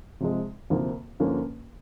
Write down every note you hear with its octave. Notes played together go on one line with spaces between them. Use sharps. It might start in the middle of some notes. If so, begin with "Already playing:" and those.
C3 F3 G#3
D2 C3 F3 A#3
G2 D3 F3 A#3 C#4